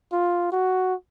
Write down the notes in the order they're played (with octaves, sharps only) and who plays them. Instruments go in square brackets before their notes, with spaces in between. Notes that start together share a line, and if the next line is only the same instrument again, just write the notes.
[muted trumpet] F4
F#4